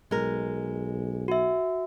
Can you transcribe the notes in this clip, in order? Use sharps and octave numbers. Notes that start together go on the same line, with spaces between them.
B1 G#3 A#4
F#4 E5